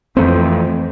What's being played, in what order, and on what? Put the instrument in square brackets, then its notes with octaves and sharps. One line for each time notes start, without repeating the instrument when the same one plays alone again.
[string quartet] F2 [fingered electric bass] E3 A3 C4